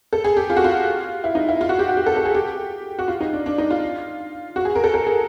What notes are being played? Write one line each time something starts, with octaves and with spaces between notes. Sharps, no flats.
A4
G#4
G4
F4
F#4
F4
E4
D#4
E4
F4
F#4
G4
F#4
G4
A4
A4
G#4
G4
F#4
F4
D#4
D4
D4
D#4
F4
F#4
G#4
A#4
A4
A4
G#4